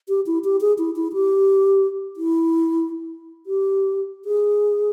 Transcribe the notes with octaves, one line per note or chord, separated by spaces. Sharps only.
G4
E4
G4
G#4
E4
E4
G4
E4
G4
G#4